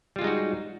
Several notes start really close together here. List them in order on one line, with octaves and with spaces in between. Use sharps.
G3 F4 G#3 D#4 F#4